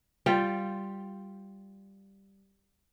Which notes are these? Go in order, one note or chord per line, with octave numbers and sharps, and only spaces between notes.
G3 F4 G5